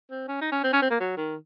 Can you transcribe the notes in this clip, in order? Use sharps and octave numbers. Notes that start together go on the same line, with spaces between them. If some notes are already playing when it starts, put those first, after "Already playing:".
C4
C#4
D#4
C#4
C4
C#4
C4
A#3
F#3
D#3